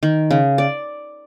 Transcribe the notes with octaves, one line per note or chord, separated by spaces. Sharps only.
D#3
C#3
D5